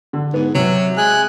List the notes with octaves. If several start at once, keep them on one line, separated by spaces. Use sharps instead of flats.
D3
G#2 B3
C3 F#3
G#3 G#5 F#6